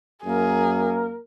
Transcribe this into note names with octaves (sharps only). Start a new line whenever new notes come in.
F#2 A#3 G#4 A#4